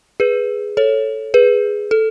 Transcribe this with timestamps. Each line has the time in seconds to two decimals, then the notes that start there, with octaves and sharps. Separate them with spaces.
0.20 G#4 B4
0.77 A4 C#5
1.34 G#4 B4
1.91 A4